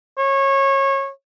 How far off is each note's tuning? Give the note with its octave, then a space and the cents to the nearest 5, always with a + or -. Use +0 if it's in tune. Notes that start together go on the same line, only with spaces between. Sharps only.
C#5 -25